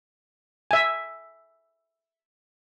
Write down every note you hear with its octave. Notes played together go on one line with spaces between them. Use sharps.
E5 G#5